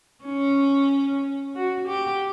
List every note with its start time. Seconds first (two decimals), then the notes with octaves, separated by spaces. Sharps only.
0.25 C#4
1.56 F#4
1.88 G4